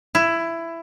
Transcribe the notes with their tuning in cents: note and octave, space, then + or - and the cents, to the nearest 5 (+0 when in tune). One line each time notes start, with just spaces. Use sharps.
E4 +15